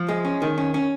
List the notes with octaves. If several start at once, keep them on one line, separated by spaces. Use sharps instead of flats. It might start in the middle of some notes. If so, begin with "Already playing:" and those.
Already playing: F3
G#3
C#4
D#3
C#4
C#4